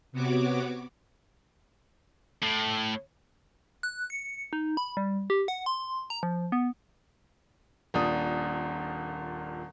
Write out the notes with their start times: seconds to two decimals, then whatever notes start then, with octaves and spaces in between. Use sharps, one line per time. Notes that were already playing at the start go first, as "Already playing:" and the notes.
0.12 C3 B3 F#4 C#5 D6
2.42 A2
3.83 F#6
4.10 C#7
4.53 D#4
4.77 B5
4.97 G3
5.30 G4
5.48 F#5
5.66 C6
6.10 A#5
6.23 F3
6.52 B3
7.94 D#1 A#2 D4 D#6